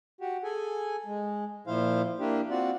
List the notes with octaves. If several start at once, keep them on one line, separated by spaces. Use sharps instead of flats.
F#4 G4
G#4 A4 G#5
G#3
A#2 F3 E4 C5 F5
A#3 D4 E4 G4
C4 F4 F#4 D5